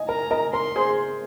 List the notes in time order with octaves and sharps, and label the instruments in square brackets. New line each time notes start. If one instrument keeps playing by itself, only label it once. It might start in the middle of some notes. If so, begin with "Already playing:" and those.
Already playing: [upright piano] D#5 G#5
[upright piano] A#4 [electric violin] A#5
[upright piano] A#4 D#5
[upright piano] A#4 [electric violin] C6
[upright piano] G#4 C5